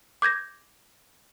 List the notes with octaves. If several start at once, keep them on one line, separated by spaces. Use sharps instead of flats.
D6 G6 G#6 A#6